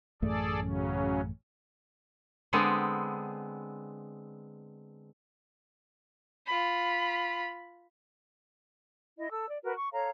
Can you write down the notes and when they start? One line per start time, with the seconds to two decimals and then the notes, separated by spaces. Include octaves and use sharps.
0.22 A1 F#2 A3 G#4 A4 D5
0.60 C#3 F#3 C#4
2.53 D3 G#3 B3 C4
6.47 F4 B5
9.18 E4 D#5
9.31 A4 E6
9.49 D5
9.64 F#4 A#4 B4
9.76 C#6
9.93 A4 C#5 F5 A#5